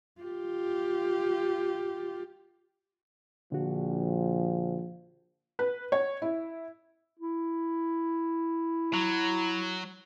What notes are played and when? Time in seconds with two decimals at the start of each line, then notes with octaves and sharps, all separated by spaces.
0.21 F4 G4
3.52 A#1 D3 F3 F#4
5.59 B4
5.92 C#5
6.22 E4
7.19 E4
8.93 F#3